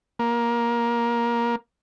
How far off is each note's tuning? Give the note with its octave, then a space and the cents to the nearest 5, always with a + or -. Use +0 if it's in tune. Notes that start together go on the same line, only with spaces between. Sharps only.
A#3 +15